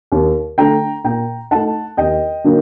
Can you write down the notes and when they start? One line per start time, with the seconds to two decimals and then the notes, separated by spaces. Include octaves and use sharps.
0.12 D#2
0.58 D3 A3 G5 A#5
1.04 A#2 G5 A#5
1.51 A3 D#4 F#5 A5
1.97 D#2 D#5 G5
2.44 D3 F#3 A#3 D#4